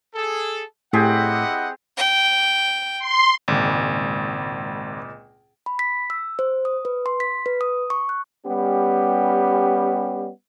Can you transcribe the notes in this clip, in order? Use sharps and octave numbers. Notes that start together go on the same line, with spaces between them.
G#4 A4
A2 C4 E4 G4 G#4 D#5 F#5
G5
C6
G#1 C#2 A#2
B5
B6
E6
C5
D#6
B4
C6
B6
B4
D#6
C#6
F#6
G3 B3 C#4 G4